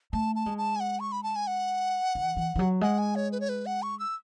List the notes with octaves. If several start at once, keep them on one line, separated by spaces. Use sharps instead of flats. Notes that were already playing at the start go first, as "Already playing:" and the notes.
A3 A5
A5
G#3
A5
G#5
F#5
C#6
B5
A5
G#5
F#5
E3
E3
E3
F#3
G#3 F#5
G#5
C#5
B4
C#5
B4
F#5
C#6
E6